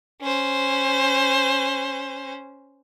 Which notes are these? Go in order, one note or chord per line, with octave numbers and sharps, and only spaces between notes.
C#4 C5